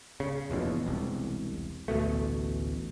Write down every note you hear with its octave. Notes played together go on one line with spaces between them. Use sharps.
C#3
F1 A#1 E2 B2
E1 C2
A1 D2 B2 A3